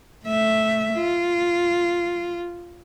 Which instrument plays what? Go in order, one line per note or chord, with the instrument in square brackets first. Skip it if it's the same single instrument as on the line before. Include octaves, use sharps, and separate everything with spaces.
[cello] A3 E5
F4